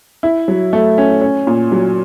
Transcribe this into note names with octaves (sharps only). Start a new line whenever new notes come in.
E4
F#3
A3
C#4
C#4
A#2
F#3